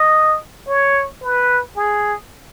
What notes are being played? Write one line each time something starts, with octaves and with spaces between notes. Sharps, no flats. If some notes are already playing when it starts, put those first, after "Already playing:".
Already playing: D#5
C#5
B4
G#4